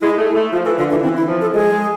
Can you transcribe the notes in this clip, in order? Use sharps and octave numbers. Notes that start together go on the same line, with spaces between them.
G#3 E4
A3
E4
A3
F3 F4
E3 A4
D3 F4
E3 D4
E3 C4
E4
F3
A4
G#3 G#4
G#3